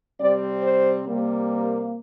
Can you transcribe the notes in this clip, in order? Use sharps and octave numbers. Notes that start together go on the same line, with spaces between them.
C3 G3 C4 D5
C5
C3 G3 A#3
A#4